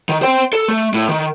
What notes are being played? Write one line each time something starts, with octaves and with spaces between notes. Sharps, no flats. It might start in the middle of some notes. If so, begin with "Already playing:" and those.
D#3
C5 G5
A4
A3
A2
D#3